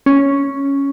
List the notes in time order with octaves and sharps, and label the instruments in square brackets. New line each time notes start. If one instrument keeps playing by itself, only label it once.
[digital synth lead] C#4